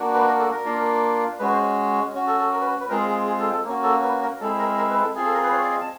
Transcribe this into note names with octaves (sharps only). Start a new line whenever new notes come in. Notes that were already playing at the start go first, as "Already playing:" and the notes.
Already playing: A#3 D4 F#4
B4
A#4
A4
A#4
A#3 D4 F4
G#3 C#4 F#4 B4
C5
C#4 F#4
A4
A4
A#4
B4
B4
G#3 C4 F4 G#4 A#4
G#4
G#4
A4
A4
A#3 C#4 F#4
A4
B4
A#4
G#3 C4 E4 A4
A#4
A#4
B4
A4
C4 F4 G#4
A4
A#4
B4
C#5
D5
D#5
A5